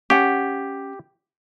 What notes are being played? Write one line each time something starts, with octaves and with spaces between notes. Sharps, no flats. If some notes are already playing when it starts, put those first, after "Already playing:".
C#4 G4 F#5